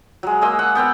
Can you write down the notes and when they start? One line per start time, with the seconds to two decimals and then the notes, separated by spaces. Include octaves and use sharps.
0.23 F#3 G#3
0.41 G#3 A#3 D#5 E6
0.59 F#5 E6
0.75 B3 G5 A#5 E6